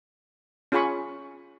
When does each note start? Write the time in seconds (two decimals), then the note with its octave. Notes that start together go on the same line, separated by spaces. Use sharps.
0.72 C#4 F4 G#4 G#5 B5 C#6